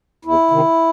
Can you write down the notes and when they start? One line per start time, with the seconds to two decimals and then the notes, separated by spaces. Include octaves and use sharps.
0.25 E2 E4
0.51 C3 D#3